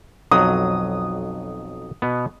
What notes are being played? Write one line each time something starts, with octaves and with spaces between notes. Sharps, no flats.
B1 F2 F#3 D#6
B2 B3